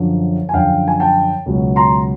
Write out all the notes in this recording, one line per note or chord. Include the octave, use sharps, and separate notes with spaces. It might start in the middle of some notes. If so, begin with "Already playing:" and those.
Already playing: F#2 D3 F3
G#5
F#2 D3 F3 F5 G5
G#5
G5 A5
C#2 B2 F#3
A#5 C6